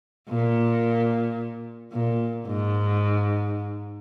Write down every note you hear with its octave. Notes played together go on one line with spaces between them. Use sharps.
A#2
A#2
G#2